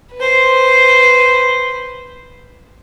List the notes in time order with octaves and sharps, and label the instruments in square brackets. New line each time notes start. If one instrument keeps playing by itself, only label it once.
[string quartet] B4 C5